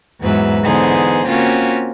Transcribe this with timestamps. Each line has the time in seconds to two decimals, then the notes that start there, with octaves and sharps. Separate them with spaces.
0.21 E2 G#2 F#3 B4 E5
0.65 D3 E3 B3 D#4 G#4 C5
1.27 A#3 C4 C#4 F4 F#4